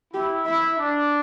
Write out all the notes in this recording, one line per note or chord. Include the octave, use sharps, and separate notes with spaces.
E4 G4
E4 E5
D4